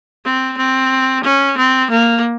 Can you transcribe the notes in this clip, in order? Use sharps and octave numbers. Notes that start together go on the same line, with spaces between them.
C4
C4
C#4
C4
A#3